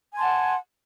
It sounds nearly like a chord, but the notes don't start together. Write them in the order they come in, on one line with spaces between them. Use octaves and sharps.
G#5 C6 A5 F#5